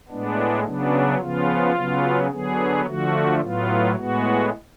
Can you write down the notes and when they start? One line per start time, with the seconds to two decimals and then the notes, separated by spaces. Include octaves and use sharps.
0.09 A2 G#3 B3 D4
0.65 C#3 F#3 B3 D4
1.19 C#3 F3 B3 F4
1.75 C#3 F#3 B3
2.31 D3 F#3 B3 G#4
2.86 D3 F3 A3 F#4
3.41 A2 F#3 B3 F4
3.96 A2 G#3 B3 F#4